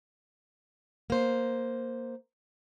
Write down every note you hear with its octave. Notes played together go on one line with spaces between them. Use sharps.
A#3 C5